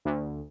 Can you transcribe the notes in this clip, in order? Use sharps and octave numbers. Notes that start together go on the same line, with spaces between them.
D2